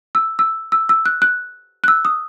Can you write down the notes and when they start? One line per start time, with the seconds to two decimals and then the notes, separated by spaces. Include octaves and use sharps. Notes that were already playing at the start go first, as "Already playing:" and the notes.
0.15 E6
0.39 E6
0.72 E6
0.89 E6
1.06 F#6
1.22 F#6
1.84 F#6
1.88 E6
2.05 D#6